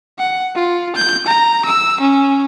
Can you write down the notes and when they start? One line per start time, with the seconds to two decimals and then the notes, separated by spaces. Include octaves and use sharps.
0.18 F#5
0.55 F4
0.96 G6
1.27 A#5
1.65 E6
2.00 C#4